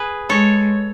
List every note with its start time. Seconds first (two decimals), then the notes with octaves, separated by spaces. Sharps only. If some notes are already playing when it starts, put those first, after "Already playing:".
Already playing: G#4 B4
0.29 G#3 A4 C#5